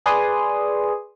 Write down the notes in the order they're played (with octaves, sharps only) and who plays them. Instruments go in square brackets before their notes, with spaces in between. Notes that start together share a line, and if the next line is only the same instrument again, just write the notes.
[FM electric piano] G#4 B4 D5 G#5 C6 D#6